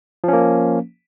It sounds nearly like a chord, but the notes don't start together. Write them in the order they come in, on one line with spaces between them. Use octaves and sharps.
F3 C#4 A#3